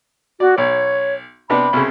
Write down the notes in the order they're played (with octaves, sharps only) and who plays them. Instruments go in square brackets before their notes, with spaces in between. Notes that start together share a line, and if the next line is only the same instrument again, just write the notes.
[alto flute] F#4 [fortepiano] D5
[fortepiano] B1 [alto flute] C#5
[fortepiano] C3 B3 D4 [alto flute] B5
[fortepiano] C2 C#3